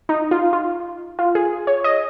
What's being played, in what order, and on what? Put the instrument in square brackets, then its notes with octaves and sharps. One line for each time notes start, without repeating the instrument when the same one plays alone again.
[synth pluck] D#4
F4
F4
F4
G#4
C#5
D#5